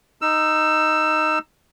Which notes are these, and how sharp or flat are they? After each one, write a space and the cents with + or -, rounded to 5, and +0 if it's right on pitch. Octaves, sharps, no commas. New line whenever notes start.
D#4 +0 E6 +15